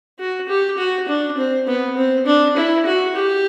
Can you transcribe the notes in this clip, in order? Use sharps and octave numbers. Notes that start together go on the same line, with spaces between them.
F#4
G4
F#4
D4
C4
B3
C4
D4
E4
F#4
G4